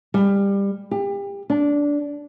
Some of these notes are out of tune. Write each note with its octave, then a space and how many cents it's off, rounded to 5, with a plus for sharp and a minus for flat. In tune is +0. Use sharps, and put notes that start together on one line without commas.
G3 +20
G4 +30
D4 -15